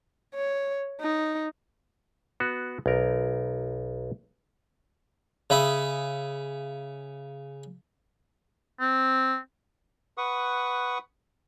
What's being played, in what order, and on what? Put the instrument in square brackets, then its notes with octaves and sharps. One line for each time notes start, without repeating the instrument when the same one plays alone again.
[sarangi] C#5
D#4
[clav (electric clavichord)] B3 F#4
B1 A#4
[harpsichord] C#3 E5 B5 D#6
[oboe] C4
[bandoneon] B4 F#5 C#6 D#6